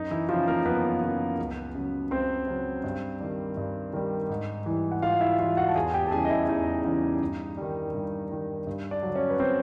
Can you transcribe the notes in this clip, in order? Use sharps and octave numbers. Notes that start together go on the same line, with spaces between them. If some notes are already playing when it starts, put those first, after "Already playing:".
Already playing: F#2 D#4
E3 E4
C#3 F3 F4
A#3 A#4
F#2 B3 B4
C#3 F3
C#2
C#3 F#3
C#2 C4 C5
C#3 F#3
G2
D#3 G3
G2
D#3 G3
G#2
E3 G3
F#5
G#2 F4 F5
E4 E5
E3 G3 F4 F5
F#4 F#5
A5
E2 G#4 G#5
G4 G5
A5
C#3 E3 G3 G#4 G#5
D#5
E4 E5
E2 D#4 D#5
C#3 E3 G3
G2
D#3 G3
G2
D#3 G3
G2
D4 D5
D3 F#3
C#4 C#5
B4
C4 C5